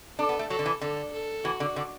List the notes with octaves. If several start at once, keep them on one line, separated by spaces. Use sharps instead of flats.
D4 A4
B3
A3
F#3 A4
D3
E3
D3 A4
A4
E3 F#4
D3
D3